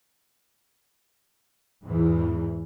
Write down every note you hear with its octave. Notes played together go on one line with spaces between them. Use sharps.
E2 G#2 E3